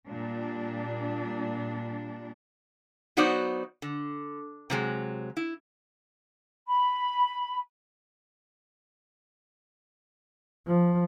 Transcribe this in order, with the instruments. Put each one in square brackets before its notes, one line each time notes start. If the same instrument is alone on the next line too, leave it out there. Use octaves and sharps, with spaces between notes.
[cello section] A#2 G3 D4
[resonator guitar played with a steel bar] F#3 B3 D#4 F#4 C5 D5
D3
C3 F#3 G#3
E4
[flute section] B5
[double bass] F3